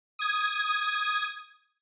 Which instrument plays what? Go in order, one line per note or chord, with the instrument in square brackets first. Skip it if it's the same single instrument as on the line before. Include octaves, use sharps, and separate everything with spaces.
[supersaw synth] D#6 G#6